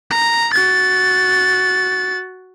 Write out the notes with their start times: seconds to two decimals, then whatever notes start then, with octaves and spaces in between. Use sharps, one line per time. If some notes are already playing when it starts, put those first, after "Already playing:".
0.11 A#5
0.53 F#4 A6